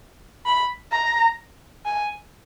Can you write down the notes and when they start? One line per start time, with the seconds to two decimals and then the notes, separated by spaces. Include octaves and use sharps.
0.46 B5
0.92 A#5
1.86 G#5